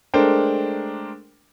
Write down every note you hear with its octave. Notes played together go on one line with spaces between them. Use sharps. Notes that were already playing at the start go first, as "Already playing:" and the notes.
G#3 A3 D4 A#4 C5 G5